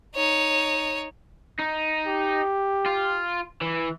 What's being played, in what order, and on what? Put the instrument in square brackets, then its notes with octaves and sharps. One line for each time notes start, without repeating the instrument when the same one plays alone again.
[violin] D#4 C#5
[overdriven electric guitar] D#4
[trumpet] G4
[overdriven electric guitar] F4
E3